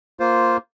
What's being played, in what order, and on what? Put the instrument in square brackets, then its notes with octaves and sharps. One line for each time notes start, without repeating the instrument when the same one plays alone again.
[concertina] A#3 F4 C5